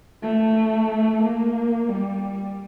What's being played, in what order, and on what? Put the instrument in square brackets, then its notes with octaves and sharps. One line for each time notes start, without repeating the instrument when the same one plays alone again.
[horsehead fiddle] A3
A#3
G3